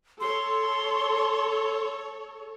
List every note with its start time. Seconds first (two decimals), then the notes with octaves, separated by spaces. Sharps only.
0.21 A4 C#5 C6